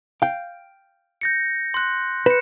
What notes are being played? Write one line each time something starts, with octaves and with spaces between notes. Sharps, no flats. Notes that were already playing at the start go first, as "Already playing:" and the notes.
F5 G5
G6 A#6 C#7
C6 F#6
B4 C#7 E7